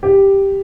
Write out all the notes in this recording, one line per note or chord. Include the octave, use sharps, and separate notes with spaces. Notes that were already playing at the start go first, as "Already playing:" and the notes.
G4